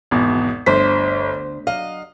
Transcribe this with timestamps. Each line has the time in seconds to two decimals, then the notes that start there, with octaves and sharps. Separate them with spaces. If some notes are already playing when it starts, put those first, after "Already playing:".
0.11 G#1 E2 B2
0.66 G1 D2 C5 B6
1.67 F#3 D#5 F5